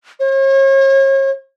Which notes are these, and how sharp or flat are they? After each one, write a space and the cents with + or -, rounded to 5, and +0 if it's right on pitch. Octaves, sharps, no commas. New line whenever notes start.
C#5 -40